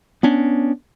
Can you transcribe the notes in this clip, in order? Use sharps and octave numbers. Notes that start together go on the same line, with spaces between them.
B3 C#4 D4